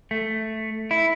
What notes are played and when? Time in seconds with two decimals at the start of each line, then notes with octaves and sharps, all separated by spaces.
0.11 A3
0.91 E4